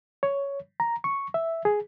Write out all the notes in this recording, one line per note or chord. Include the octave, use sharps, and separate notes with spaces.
C#5
A#5
C#6
E5
G#4